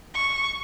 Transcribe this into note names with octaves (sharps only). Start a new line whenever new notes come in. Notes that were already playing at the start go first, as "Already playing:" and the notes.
C#6